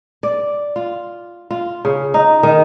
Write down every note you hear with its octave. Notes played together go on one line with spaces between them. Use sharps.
D5
F4
F4
C#3
D#4
D#3